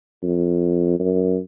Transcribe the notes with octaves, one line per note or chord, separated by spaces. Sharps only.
F2
F#2